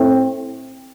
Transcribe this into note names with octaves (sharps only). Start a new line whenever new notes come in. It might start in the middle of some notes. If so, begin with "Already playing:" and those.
Already playing: A2 A3 C4